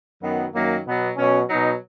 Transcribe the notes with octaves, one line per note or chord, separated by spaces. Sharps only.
F#2 D#3 F#3 B3
F#2 D#3 F#3 A#3
B2 F#3 B3
B2 F#3 C#4
B2 F#3 D#4